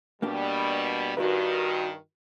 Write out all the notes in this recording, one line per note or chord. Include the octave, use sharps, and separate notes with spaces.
B2 G3 A#3 D4 G4
G2 D#3 F#4 A#4 B4